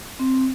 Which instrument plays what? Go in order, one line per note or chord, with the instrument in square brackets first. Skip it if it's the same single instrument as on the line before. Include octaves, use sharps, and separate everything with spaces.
[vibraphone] C4